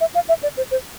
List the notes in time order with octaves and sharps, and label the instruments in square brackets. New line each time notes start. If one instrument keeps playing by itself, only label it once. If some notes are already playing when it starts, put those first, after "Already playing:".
[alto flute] E5
F5
E5
D5
C5
C5